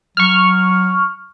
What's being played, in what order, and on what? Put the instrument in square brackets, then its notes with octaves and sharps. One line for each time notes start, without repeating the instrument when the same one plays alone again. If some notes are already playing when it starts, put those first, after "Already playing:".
[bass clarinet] F#3 [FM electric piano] C#6 F6